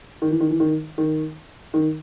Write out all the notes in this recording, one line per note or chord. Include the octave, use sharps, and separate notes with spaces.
D#3
E3
D#3
E3
D#3
D#3
D#3